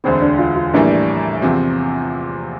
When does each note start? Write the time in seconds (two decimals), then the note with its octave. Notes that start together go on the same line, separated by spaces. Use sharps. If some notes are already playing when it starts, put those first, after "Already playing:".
0.04 E1 D2 D3 C4
0.22 D4
0.39 F4
0.56 F4
0.74 A#1 A2 E3 G3 A#3 D4
1.42 E2 C3 F3 C4